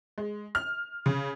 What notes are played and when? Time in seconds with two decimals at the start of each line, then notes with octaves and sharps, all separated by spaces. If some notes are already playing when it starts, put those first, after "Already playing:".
0.18 G#3
0.55 F6
1.06 C#3